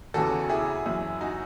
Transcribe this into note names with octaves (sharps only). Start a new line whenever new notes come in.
E2 C#3 E3 F#4 A4
E4 G#4
F#2 E3
D#4 F#4